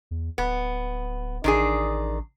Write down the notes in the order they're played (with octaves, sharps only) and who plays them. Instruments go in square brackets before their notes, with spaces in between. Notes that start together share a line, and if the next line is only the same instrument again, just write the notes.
[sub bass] E2
[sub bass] D1 [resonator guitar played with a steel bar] B3
[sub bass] A1 [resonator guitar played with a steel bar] D#3 D4 G#4